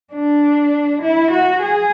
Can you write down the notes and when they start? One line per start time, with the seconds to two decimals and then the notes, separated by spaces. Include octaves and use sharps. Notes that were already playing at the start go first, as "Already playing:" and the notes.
0.13 D4
1.02 E4
1.31 F#4
1.62 G#4